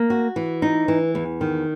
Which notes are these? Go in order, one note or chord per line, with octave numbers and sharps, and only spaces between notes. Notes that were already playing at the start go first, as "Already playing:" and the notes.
Already playing: A#3
F#4
E3
D#4
E3
E2
D#3